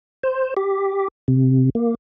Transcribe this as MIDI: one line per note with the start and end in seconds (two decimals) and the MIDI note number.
0.23 0.54 72
0.57 1.08 67
1.28 1.70 48
1.75 1.95 58